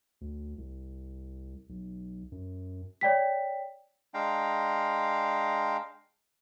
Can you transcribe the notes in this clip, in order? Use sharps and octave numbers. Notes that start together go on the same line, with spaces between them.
D2
C2
B1
F#2
C#5 D5 G5 B6
G#3 D4 F5 G5 A#5